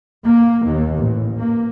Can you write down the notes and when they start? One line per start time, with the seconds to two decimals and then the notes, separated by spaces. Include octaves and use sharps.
0.24 A#3
0.65 D#2
0.97 A1
1.40 A#3